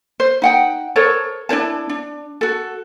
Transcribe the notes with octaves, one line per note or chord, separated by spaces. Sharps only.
C5
D#4 F#5 G5
A4 A#4 C5 C#5
D4 E4 C5 A5
D4
F#4 A4